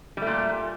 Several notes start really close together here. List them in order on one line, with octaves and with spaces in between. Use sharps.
G3 A3 A#2